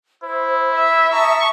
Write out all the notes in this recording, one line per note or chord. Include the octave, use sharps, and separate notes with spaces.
E4 C5
E5 E6
A5 A#5 C#6 D#6